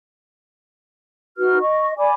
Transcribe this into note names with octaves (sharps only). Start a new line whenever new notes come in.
D#4 F#4 B4 F6
D#5 C#6
D5 G#5 B5 D6